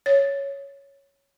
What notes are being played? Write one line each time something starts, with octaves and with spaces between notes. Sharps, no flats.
C#5